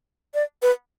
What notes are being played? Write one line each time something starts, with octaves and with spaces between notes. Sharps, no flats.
D5
B4